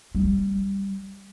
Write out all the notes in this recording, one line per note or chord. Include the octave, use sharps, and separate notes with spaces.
G3